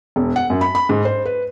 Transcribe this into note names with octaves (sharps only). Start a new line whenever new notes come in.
E1
F#5
F#2
B5
B5
G#2
C5
B4